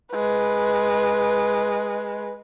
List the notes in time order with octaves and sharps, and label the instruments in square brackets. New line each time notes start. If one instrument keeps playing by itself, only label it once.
[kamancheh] G#3 B4